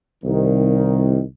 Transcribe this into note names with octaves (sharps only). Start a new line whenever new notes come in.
C2 D#3